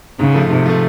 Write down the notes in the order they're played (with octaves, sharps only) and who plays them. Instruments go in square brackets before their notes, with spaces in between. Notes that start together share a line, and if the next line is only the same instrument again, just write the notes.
[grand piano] G#2 [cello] C#3
[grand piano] F3 A3
[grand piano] G#2 [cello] C3
[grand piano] F3 A3